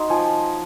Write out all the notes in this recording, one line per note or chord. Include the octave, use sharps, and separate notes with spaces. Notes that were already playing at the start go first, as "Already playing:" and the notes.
Already playing: F#3 D#4 C6
F3 G#5